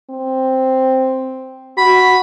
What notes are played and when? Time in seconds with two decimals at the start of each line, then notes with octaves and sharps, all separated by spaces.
0.10 C4
1.78 F#4 B5